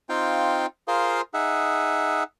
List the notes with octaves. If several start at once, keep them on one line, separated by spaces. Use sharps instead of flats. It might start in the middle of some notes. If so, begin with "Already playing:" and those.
C4 D#4 F4 F5 G5
F4 G#4 A#4 C5 F5 C6
D#4 G#4 E5 F#5